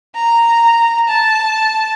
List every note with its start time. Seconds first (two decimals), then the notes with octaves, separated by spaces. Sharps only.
0.15 A#5
1.08 A5